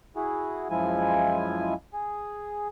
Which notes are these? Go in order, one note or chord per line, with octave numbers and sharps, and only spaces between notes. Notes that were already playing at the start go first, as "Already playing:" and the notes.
E4 F#4 G#4
F#2 F3 G#3 E4 F4 G#5
G#4